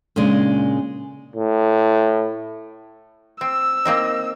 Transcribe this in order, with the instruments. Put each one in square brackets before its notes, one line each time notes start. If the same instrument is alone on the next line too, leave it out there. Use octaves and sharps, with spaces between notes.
[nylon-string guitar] A#2 C#3 G#3 D4
[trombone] A2
[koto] C4 [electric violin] E6
[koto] A#3 C4 D#4